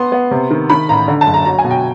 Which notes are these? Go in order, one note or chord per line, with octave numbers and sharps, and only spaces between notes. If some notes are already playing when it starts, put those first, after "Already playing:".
Already playing: B3 C6
B3
C3
D#3
D#3 B5
A1 A#5
D3
A5
F#1
A#5
F#3 A#5
G#5
B2
G5